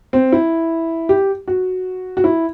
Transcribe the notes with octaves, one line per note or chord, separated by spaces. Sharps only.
C4
E4
G4
F#4
F#4
E4